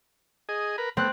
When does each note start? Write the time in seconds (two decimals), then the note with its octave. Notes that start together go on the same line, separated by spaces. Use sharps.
0.49 G#4 D#5
0.78 A#4 B4
0.97 A3 B3 C4 F#6